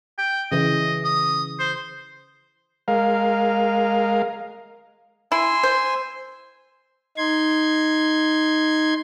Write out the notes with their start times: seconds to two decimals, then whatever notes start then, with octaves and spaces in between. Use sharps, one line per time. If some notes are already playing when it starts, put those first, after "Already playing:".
0.18 G5
0.52 C#3 E3 D#5
1.04 D#6
1.59 C5
2.88 G#3 A#4 F5
5.32 E4 G#5 C6 E6
5.63 C5
7.17 D#4 C6 G#6